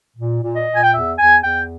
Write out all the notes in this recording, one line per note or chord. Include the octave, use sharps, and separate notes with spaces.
A#2
A#2
D#5
A#2
G#5
G5
E2 E5
E2 G#5
E2 G5